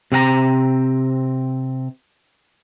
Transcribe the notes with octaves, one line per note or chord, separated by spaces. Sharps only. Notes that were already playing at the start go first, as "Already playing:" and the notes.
C3 C4 F5 A#5